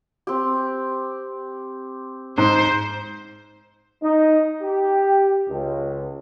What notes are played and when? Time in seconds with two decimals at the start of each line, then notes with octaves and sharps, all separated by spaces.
0.27 C4 G4
2.38 G#2 C5
4.03 D#4
4.62 G4
5.49 C#2